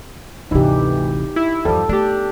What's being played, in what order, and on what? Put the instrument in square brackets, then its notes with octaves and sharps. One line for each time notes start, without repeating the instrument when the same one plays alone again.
[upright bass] G#1 C3 [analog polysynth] D2 E3 [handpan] D#4 G4
[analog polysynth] E4
[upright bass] E2 G2 [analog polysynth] F3 G3 [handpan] A4
[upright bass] A3 B3 [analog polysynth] D4 G4